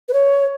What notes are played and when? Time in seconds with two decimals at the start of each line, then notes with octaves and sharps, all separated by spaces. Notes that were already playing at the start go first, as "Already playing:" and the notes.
0.09 B4
0.13 C#5